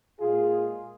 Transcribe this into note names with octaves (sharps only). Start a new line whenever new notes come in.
A#2 G#3 F4 G#4